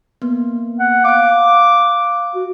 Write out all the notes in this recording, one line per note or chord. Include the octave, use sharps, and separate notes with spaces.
A#3 B3
F#5
F5 D6 F#6
F#4